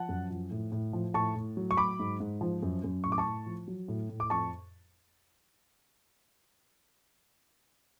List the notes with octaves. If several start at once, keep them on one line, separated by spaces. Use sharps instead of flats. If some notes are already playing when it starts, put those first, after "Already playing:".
Already playing: F3 F#5 A5
F#2
F3
A2
A2
F3
A2 A5 C#6
A2
F#3
C#6
F#3 B5 D6
G#2
G#2
F3
F#2
F#2
A2 C#6
D6
A5 C#6
A2
F3
F#3
A2
A2
D6
F2 A5 C#6